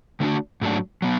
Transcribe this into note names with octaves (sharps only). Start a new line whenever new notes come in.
D3 A3 D4 F#4
G#2 F#3 A3 D4
F#3 B3